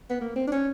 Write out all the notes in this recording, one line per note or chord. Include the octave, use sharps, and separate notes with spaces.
B3
A#3
C4
D4
C#4